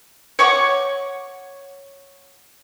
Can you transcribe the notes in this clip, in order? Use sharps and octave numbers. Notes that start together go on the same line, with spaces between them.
C#5 F#5 C#6 D6